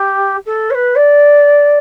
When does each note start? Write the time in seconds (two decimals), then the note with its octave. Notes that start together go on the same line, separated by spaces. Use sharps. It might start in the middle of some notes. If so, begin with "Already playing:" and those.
Already playing: G4
0.46 A4
0.70 C#5
0.74 B4
0.95 D5